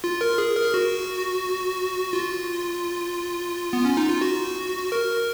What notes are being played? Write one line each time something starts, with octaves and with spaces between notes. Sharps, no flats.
F4
A#4
G#4
A#4
F#4
F4
B3
C#4
D#4
F4
F#4
A#4